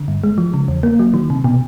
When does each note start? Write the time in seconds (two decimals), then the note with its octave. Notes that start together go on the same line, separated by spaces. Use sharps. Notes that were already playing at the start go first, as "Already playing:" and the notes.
Already playing: D3
0.08 G2
0.24 G#3
0.38 F3
0.54 C#3
0.68 E2
0.83 A#3
0.99 F#3
1.14 D#3
1.30 C3
1.44 B2